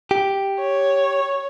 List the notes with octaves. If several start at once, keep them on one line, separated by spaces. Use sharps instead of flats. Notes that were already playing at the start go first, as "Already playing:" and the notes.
G4
C#5